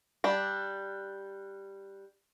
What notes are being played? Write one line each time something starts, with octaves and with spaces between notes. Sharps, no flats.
G3 D4